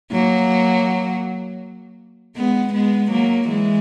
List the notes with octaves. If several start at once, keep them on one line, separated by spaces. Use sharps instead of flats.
F#3 A#3
G#3 B3
G#3 B3
F#3 A#3
E3 G#3